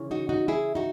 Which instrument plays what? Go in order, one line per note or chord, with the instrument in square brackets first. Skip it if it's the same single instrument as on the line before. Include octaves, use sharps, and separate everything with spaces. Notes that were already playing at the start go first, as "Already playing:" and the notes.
Already playing: [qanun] C#3 E3 G#3 C#4
[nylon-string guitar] D#4 F#4
D#4 F#4
E4 G#4
D#4 F#4